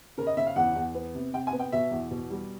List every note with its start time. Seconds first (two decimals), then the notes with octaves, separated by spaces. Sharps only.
0.18 C#3 A#4
0.27 D#5
0.37 C#3 E5
0.46 F5
0.56 E2 F#5
0.75 E2
0.95 B3
1.15 C3
1.33 C3 G5
1.47 G#5
1.53 B3
1.59 G5
1.72 B2 E5
1.91 E2
2.11 B2
2.30 G3